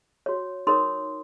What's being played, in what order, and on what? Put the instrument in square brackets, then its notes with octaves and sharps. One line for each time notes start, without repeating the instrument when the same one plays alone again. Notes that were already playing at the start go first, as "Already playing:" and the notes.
[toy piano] F#4 C#5
D#4 A#4 C#5 C6 D#6